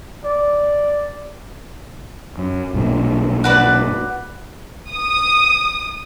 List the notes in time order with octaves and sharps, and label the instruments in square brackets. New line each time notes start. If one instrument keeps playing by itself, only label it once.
[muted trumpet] D5
[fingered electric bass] F#2
B1 G2 A#2
[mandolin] F#4 B4 D5
[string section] D#6